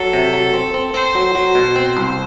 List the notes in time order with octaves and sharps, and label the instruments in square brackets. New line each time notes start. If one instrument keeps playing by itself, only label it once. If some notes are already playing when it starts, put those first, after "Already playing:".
Already playing: [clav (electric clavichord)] F#3 [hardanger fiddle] A4
[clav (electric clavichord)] C3
F#3
C4
C4
[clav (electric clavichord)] C4 [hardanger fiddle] C5
[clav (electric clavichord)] F#3
F#3
B2
C4
C2